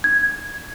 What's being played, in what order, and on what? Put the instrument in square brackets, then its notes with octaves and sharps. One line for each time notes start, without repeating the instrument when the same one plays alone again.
[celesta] G#6